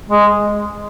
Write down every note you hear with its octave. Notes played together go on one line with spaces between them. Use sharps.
G#3